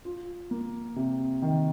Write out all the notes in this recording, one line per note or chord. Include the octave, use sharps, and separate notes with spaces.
F4
A#3
C3
D#3